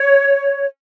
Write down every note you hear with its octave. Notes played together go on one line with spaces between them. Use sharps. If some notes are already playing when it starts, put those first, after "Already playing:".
Already playing: C#5